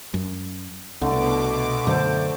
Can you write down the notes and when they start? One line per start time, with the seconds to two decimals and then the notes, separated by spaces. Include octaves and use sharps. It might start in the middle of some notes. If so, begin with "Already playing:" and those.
0.14 F#2
1.02 C2 B2 D3 A3 D6
1.87 F#2 D3 A3 C5